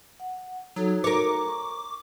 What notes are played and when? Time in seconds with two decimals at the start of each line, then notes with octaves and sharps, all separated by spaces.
0.20 F#5
0.76 F#3 D#4 F#4 A4
1.04 A#4 C#5 D6
1.48 C#6